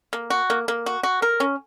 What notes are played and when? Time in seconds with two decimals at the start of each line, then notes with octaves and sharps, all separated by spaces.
0.13 A#3
0.30 F#4
0.50 A#3
0.68 A#3
0.86 F#4
1.03 F#4
1.22 A#4
1.40 C#4